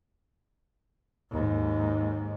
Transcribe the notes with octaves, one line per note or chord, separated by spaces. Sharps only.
D#2 G#2